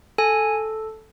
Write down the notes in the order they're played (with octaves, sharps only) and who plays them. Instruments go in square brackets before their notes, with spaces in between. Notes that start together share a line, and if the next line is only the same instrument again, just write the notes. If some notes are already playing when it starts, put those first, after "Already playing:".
[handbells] A4 G#5